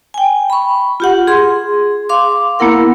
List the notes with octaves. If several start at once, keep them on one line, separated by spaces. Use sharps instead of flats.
G5 G#5
B5 C#6
F4 G4 F#5
G#4 C6
F5 C6 D6
A#3 B3 E4 A#4 F#5